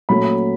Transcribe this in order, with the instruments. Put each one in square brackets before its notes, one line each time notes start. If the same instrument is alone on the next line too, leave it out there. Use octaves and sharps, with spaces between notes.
[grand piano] A#2 F#3 A3 C#4 B5